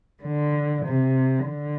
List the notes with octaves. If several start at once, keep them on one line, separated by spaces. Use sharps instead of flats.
D3
C3
D3